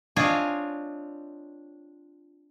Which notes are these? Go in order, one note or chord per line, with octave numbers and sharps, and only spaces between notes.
C4 D4 F4 C#5 D#5 G#5